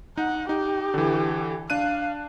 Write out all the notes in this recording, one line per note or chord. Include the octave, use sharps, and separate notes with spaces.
D#4 F#5
D#4 G4
D3 E3
D4 F5 F#6 D#7